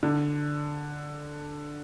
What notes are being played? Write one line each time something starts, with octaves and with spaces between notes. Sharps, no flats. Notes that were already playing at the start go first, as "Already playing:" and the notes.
D3